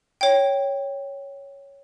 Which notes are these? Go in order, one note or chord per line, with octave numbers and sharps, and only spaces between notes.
C#5 G5